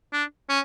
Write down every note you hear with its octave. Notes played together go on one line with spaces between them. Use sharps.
D4
C#4